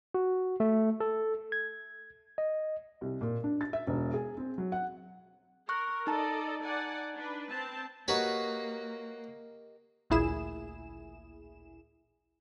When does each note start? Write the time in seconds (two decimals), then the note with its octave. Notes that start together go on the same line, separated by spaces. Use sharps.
0.14 F#4
0.60 A3
1.00 A4
1.52 G#6
2.38 D#5
3.01 C2
3.21 A#2
3.44 D4
3.61 A6
3.73 E5
3.87 E1
4.14 G#4
4.37 C4
4.58 F#3
4.72 F#5
5.69 A#4 C#6 F#6
6.07 D#4 A4 D5 D#5 A5 A#5
6.63 D5 F#5 G#5
7.16 D4 B4
7.51 C4 A5
8.08 A#3 F#4 G4 A#4 B4 C#5 D#5
10.10 A1 D2 A#2 E4 G#4 E7